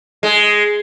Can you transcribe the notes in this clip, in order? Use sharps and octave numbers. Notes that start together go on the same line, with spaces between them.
G#3